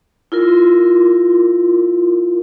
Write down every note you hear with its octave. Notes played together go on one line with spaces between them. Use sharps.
E4 F4 A#4